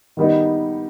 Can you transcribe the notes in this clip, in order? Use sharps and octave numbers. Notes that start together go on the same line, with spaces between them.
D#3 G3 B3 D#4